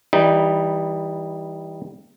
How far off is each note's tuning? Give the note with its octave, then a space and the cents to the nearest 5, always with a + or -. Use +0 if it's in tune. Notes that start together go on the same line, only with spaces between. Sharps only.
E3 -25 G3 +5 D#4 -5